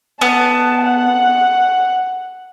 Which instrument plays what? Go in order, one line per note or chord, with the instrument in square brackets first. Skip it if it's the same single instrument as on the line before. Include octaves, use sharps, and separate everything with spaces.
[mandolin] B3 [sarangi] A5
[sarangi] F#5